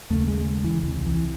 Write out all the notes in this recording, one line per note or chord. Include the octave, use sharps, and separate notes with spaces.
D#2 C#3 A3
G#3
E3
C2 C3
E3